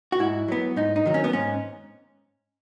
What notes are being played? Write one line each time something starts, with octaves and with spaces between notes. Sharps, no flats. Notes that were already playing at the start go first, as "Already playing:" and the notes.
F#4
G#2 E4
F#3 B3
G#2 D#4
D#4
D#3 F#3
C#4
B3
G#2 C#4